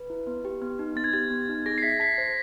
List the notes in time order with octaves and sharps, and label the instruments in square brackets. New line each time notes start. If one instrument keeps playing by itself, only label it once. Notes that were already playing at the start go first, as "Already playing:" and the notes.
Already playing: [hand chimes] B4
E4
B3
G4
B3
D#4
[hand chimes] B3 [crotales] A6
[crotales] G#6
[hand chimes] G4 [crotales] A6
[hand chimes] B3
D#4
[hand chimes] G#4 [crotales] A#6
[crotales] C7
[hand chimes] E5 [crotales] B6
[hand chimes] A5 [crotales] B6
[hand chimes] C5